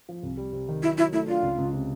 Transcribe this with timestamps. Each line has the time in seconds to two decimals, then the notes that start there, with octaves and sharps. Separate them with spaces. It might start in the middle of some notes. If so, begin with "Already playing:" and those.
0.09 F3
0.23 C2
0.37 G3
0.53 C3
0.69 D#3
0.82 F#3 E4
0.97 F#3 E4
1.12 A3 E4
1.28 D4 F4
1.43 C#2
1.58 C#2
1.73 C3